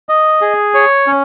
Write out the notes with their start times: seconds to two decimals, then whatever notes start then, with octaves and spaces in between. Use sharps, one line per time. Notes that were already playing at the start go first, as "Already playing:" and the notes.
0.09 D#5
0.41 G#4
0.74 C#5
1.07 C#4